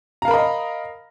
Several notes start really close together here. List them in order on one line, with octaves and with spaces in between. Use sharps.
A#5 F5 A#4 B5 D#5